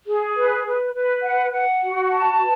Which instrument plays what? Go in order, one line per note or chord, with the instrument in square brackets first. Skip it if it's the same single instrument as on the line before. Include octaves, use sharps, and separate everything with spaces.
[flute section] G#4
B4
B4
B4
F#5
F#5
F#4
A5
B4